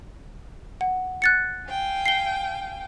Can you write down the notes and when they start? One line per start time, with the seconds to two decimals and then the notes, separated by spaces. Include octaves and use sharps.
0.81 F#5
1.22 F#6 A6 C#7
1.68 F5 G5 G#5
2.06 C7 G7